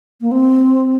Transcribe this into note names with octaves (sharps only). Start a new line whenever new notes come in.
A#3
C4